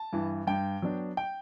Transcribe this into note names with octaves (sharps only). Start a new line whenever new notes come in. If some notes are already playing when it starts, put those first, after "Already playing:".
Already playing: A5
G2 E3
G2 G5
F#3 B3 D4
G5